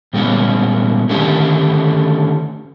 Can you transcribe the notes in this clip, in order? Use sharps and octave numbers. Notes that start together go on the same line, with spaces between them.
A#2 G3 G#3 A#3 B3 C#4
D3 D#3 A3 C#4 D4 G4